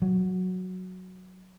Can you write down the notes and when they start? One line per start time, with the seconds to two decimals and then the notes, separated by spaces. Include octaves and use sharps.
0.02 F#3